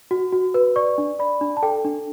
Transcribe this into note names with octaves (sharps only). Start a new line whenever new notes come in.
F#4
F#4
B4
D5 C#6
D4
D5 B5
D4
A5
A4 G5
D4